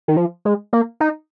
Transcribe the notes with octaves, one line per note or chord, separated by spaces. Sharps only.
D#3
F3
G#3
A#3
D#4